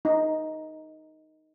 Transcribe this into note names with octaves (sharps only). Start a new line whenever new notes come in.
D#4